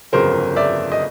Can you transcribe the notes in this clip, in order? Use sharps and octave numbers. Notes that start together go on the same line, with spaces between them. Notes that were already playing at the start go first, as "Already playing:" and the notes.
G1 F2 C#3 F#3 A#4 C5
D5 E5
D#5